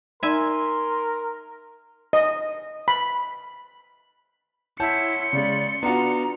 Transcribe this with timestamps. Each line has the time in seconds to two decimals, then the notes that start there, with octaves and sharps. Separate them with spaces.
0.23 D#4 A#4 D5 E5 G#5 B5 C6
2.13 D#5
2.88 B5
4.80 E4 C#5 F#5 A5 C6 G6 C#7
5.33 C#3 G#3 D5
5.83 B3 D4 F4 F#4 A#5